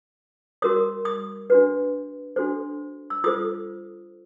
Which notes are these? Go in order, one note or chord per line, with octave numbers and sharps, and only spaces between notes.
F#4 A#4 C#5 D#6
D#6
D4 F#4 B4
D4 F#4 A4 C5
E6
F4 A4 C5 D#6